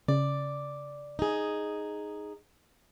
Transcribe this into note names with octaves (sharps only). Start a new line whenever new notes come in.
C#3 D5
D#4 G#4